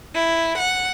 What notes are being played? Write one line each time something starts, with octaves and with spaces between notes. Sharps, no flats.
E4
F#5